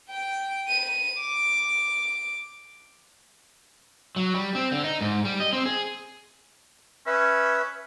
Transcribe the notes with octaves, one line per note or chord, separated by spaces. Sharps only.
G5
D#7
D6
F#3
G3
C4
D3
D#4
G#2
G3
D#5
C4
G#4
C#4 B4 E5